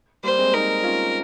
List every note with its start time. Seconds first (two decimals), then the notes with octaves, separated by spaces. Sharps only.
0.23 G3 A#3 C5
0.38 G#3 C4
0.53 C4 D#4 A#4
0.83 C#4 F4